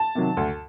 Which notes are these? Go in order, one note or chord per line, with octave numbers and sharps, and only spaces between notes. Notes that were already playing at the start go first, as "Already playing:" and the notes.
Already playing: A5
C3 D#3 F#3
D2